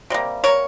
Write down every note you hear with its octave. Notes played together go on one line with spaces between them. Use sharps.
C3 G3 A#3
A#4 C#5